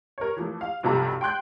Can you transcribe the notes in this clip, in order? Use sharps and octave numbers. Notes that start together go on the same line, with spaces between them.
A#4 C#5
E3 F3 A3
F5
B1 G2 C3 F3 A4 A#5
G5 C6 F#6 G6